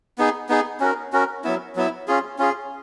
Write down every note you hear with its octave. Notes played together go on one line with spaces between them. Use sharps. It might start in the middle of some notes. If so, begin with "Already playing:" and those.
B3 D#4 G#4
B3 D#4 G#4
C#4 F#4 A#4
C#4 F#4 A#4
F#3 B3 E4
F#3 B3 E4
C#4 F4 G#4
C#4 F4 G#4